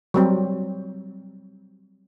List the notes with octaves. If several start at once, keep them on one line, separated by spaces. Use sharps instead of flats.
F#3 G3 C4